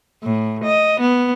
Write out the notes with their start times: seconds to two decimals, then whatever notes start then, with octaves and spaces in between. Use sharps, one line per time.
0.23 A2
0.64 D#5
1.00 B3